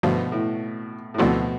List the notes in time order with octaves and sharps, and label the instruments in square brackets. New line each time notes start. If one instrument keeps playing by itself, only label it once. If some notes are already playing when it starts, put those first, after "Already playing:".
[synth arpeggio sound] G2 D3 F3 A3 [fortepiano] B2
[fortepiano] A2
A2
[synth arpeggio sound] D2 D3 F3 A3 C4 [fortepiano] B2